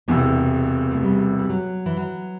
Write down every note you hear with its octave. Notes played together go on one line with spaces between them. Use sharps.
E1 E2 C3 B3
A3
G3
G3
F#3
E3
F#3